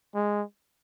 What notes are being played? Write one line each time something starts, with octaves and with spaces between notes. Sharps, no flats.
G#3